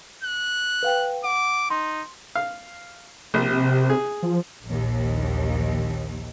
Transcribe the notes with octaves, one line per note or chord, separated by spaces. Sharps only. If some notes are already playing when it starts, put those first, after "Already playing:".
F#6
B4 F5 G5
F#5 D6
D#4 C6
F5
A#1 C3
G#4
F3
A#1 D#2